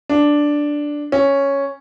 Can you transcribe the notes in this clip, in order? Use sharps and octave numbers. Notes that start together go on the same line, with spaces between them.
D4
C#4